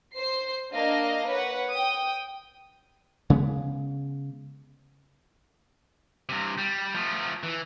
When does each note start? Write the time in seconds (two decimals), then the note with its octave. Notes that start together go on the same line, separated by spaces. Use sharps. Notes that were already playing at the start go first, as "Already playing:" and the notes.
0.13 C5 C7
0.72 A#3 D4 D#5 F5
1.28 B4 C#5 F#5
1.72 G5 D#6
3.30 C#3 G#3 B3
6.29 G2 C3
6.58 G3
6.95 F3 A3
7.43 E3